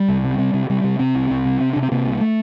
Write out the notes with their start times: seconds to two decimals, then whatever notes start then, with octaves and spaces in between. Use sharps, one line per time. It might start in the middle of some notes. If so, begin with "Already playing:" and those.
Already playing: G3
0.08 C2
0.24 C3
0.38 C3
0.54 C3
0.70 C3 G3
0.84 C3
0.99 C3 C4
1.15 C2
1.30 C2
1.46 C3
1.60 C3
1.73 C3 D4
1.82 C4
1.91 C3 A#3
2.06 C2
2.21 A3